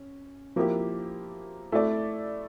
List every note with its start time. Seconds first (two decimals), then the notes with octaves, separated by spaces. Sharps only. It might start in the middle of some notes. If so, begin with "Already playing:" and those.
Already playing: C#4
0.56 F3 A#3 E4 G4 A#4
1.72 A3 E4 A4 D5